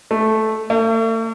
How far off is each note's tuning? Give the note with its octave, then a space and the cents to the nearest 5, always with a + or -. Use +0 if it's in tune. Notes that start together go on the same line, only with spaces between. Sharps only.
A3 -10
A3 +40